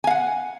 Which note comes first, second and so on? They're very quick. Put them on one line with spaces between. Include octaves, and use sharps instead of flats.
G#5 F5 F#5